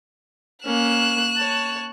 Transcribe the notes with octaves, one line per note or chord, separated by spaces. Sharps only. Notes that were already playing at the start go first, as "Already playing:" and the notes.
A#3 C#4 F#6 E7
C#5 A5